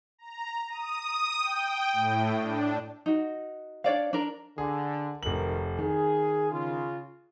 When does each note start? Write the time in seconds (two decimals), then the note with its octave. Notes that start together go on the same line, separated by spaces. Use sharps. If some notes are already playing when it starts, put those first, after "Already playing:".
0.18 A#5
0.69 D#6
1.38 G5
1.93 A2
2.40 D4
3.06 D#4 F#4
3.84 D4 C#5 D5 F5
4.13 D4 A#4
4.58 D3 G#4
5.23 F1 B1 D#3 A#4 F#7
5.79 D#3 G#4
6.52 C#3 F4